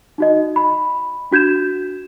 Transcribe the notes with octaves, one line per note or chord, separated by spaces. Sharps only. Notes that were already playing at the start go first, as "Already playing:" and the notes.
D#4 F#4 D#5
B5
D4 F#4 G6 G#6 E7